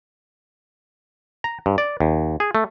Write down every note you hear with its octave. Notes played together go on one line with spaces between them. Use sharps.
A#5
G2
D5
D#2
G#4
A3